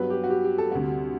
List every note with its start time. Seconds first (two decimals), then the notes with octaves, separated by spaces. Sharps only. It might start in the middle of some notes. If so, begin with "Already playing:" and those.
Already playing: G2 F#3 B3 B4
0.10 G4
0.24 F#4
0.30 G4
0.44 G4
0.58 A4
0.71 D2 C3 G3 F#4